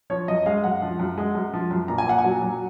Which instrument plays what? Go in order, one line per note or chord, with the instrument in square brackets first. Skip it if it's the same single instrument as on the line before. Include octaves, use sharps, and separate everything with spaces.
[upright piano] F3 C#5
F#2 D#5
G#3 F5
F#2 F#5
F3
F#2
G#3
F#2
F3
F#2
A#2 A#5
G#5
A#2 F#5
G#5
F#3
F#3